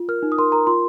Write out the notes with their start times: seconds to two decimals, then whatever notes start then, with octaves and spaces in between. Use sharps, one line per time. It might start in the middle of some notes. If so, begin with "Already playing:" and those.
Already playing: F4
0.09 A#4 F6
0.23 D#4
0.32 D#6
0.38 A#4 C6
0.52 A#4 A#5
0.67 F4 C6